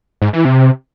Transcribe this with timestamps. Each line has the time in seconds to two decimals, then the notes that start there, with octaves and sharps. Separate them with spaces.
0.22 G#2
0.33 E3
0.45 C3